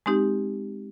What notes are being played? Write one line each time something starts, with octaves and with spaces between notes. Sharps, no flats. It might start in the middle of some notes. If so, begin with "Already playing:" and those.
G#3 C4 D#4 G4